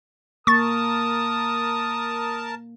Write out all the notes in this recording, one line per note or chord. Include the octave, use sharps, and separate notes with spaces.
A#3 A#4 A5 C#6 D#6 A6